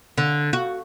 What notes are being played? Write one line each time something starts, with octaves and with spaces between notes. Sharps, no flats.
D3
F#4